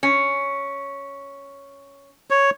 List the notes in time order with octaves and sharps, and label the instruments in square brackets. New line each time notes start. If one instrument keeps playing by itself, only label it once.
[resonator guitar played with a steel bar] C#4
[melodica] C#5